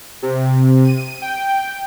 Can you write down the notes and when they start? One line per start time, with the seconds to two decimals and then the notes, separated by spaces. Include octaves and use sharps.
0.22 C3
0.84 D#7
1.22 G5